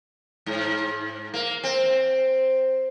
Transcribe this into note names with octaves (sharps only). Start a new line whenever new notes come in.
G#2
A#3
C4